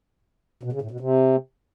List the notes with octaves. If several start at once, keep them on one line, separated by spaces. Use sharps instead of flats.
B2
C#3
A2
B2
C3